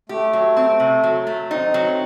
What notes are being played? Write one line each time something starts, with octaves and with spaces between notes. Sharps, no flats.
A3 G4
F#3
C4
C3
F#3
A3
C4 D#4
F#3